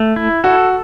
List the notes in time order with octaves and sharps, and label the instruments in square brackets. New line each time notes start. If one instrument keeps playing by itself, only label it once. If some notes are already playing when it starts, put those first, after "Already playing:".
Already playing: [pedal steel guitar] A3
E4
[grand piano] F#4 [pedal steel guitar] A4